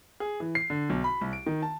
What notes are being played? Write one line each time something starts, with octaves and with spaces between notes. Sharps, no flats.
G#4
E3
C7
D3
B1
B5
C2
D7
D#3
A5